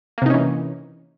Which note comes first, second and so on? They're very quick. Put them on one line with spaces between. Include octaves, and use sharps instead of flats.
A#3 C3 D#4 C#4 E3